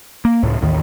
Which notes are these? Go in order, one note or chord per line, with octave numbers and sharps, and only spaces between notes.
A#3
C#2 A2
A1 D#2 D#3